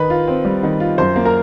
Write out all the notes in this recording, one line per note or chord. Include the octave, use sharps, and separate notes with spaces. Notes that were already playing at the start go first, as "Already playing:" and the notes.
Already playing: D#3 D#4 B4 B5
F4
C4
G3
D#3
F4
F#2 C5 C6
A#3
A#4 A#5